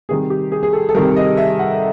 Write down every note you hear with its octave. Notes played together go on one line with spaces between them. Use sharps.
C3 D#3 G3 G#4
G4
G#4
G#4
A4
A4
C3 D#3 G3 A#4
D#5
E5
F#5